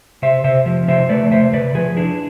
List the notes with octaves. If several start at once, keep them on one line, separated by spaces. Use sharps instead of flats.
C3 C5 E5
C3 C5 E5
F3
C3 C5 E5
A3 B4 D5
C3 C5 E5
C3 B4 D5
F3 G#4 B4
D4 E4 G#4